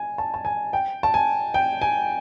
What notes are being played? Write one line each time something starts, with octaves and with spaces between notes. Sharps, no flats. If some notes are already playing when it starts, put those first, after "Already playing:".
Already playing: G#5
A5
A5
G#5
G5
A5
G#5
G5
G#5